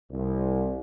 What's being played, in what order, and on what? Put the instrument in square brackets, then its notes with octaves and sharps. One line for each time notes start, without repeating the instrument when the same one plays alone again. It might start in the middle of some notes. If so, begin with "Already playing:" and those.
[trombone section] C2